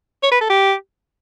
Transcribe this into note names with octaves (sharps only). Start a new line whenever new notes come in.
C#5
B4
A4
G4